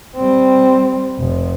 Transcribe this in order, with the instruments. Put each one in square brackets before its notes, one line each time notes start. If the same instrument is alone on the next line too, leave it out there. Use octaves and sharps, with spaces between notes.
[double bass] G3 C4
F1